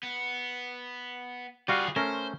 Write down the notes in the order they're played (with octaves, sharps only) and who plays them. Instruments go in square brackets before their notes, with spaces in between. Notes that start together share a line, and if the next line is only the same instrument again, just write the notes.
[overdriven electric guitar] B3
[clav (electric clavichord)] G3 F#4 F5 [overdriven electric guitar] F4 G#4
[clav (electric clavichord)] A3 C#4 A#4 [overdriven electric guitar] C5